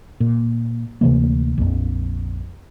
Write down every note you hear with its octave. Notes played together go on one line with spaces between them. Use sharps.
A#2
D2 C3 E3 A#3
A#1 F2